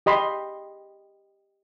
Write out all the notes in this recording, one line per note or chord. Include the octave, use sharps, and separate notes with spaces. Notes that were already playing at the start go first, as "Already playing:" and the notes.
G4 D#5 B5 C6